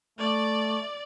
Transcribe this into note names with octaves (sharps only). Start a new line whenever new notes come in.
A3 D5